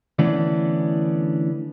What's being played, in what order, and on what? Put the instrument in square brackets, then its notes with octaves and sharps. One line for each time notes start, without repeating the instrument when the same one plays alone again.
[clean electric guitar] D3 E3 A3 B3 C#4 D4